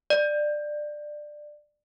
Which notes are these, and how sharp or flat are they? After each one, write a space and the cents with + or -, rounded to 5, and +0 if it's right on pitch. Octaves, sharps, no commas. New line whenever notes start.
D5 +20